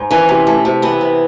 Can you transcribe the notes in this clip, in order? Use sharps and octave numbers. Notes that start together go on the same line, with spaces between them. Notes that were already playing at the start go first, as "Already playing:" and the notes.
Already playing: G#2
E3 C#4
C3
A3
C3
E3 B3
C3